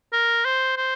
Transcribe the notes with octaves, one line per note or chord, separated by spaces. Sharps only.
A#4
C5
C5